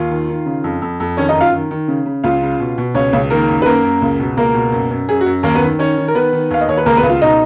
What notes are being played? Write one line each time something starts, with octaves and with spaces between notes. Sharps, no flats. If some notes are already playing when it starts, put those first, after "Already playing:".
Already playing: D#2 F4 F5
D#3
D#3
C#3
F2
F2
F2
D#3 C#4 C#5
D#4 D#5
F#2
F4 F5
D#3
D#3
C#3
C#3
C#2 F4 F5
C#3
B2
B2
C#2 C#4 C#5
C#2
D#3 A#3 A#4
F#2
B4
F#2 A#3 A#4
F#2
C#2
B2
C#2 A#3 A#4
B2
F#2
F#2
F#2 G#4
F#4
F#2
D#2 A#3 A#4
B3 B4
D#3
D#3 C#4 C#5
D#3
A#4
D#3 B3 B4
D#3
D#2 F5
D#5
D#2 C#5
B4
C#2 A#3 A#4
B3 B4
C#2
F4 F5
B2 D#4 D#5